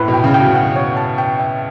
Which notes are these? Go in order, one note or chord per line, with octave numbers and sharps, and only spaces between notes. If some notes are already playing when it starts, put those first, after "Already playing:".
Already playing: A2 B4
B2
G5
C#3
G5
B2
F#5
C#5
A5
G5
E5